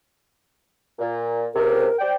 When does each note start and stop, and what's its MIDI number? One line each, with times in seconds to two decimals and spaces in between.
0.99 1.46 46
1.55 1.86 37
1.55 1.86 48
1.55 1.97 70
1.99 2.14 72
1.99 2.14 74
1.99 2.14 79